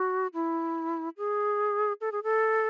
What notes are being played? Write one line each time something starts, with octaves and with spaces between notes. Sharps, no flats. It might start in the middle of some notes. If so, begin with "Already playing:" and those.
Already playing: F#4
E4
G#4
A4
G#4
A4